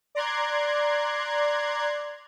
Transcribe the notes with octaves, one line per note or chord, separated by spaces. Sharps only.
D5 A#5 C6 F#6 G#6